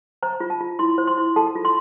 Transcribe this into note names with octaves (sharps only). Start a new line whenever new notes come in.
C5 A#5
F4
A5
F4
E4 C6
C5
C6
E4
A4 A5
F4
C6